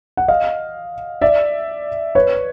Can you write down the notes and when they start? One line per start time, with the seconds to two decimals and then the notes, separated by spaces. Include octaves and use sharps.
0.17 F#5
0.28 D#5 F5
1.22 D5 E5
2.15 B4 C#5